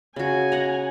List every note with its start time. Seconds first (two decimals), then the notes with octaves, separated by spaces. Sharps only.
0.16 C#3 F#4 G#5
0.52 F#5 A#5